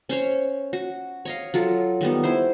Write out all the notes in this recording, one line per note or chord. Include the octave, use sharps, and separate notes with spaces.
C#4 C5 C#5
F#4
C#5 D#5 F5
F#3 F4 A4
D#3 G3 B3
E4 C5